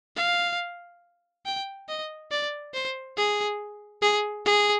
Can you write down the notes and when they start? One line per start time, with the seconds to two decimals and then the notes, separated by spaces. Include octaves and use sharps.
0.16 F5
1.46 G5
1.88 D#5
2.31 D5
2.74 C5
3.17 G#4
4.02 G#4
4.46 G#4